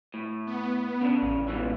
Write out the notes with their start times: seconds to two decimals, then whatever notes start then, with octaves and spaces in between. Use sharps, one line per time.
0.14 A2
0.47 B3
1.01 C#3 D4
1.22 A1
1.48 G#2 B2 E3